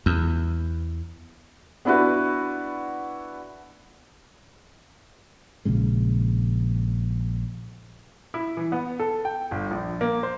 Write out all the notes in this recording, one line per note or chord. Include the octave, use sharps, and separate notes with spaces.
E2
B3 D4 E4 F#4 B4
A#1 A#2 C#3 G#3
E4
E3
B3
A4
G5
G1
A#1
A#3
C5